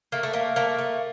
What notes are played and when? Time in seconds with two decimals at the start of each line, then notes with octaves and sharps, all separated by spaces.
0.12 A3 A#3
0.23 A3
0.33 A3 A#3
0.56 A3 A#3
0.78 A3